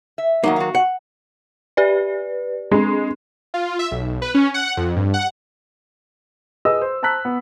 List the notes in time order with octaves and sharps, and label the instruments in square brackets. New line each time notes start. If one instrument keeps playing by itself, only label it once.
[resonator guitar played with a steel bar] E5
[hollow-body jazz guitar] D#3 F#3 A#3 [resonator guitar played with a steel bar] D#4
[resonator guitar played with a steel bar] F#4 F5
[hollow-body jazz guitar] F#5
[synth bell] G4 B4 D5
[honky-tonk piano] G#3 [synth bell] C4 D4
[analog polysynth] F4
E5
B1
B4
C#4
F#5
F2
G2
F#5
[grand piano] G#4 B4 D#5 D#6 E6
C5
C5 A5 A#5 E6 F#6 B6
B3